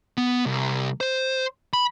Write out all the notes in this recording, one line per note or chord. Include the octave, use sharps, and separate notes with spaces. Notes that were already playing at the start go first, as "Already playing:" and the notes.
B3
C2
C5
B5